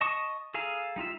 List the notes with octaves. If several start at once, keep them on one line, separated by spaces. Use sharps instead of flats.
D#5 A5 C#6 D#6
G#4 A4 F5 G#5 A#5
G3 D#4 F4 E5